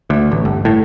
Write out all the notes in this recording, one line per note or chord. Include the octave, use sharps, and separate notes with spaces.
D2
A1
G1
A2